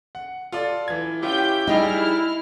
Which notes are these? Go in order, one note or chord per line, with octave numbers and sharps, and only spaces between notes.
F#5
F4 A4 D5
E3 G#6
C#4 E4 F4 G4 G5 G6
G3 D#4 E4 G#4 D#5 G5 F6